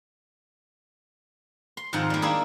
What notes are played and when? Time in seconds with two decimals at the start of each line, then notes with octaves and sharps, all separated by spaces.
1.77 C6
1.93 F2 G#2 D#3 F4 F#5
2.10 G3 A#3
2.22 A#3 D4 E4 G#4